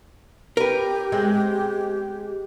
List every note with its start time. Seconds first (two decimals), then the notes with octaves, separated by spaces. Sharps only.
0.57 G4 A#4 B4
1.12 G#3 B3 C4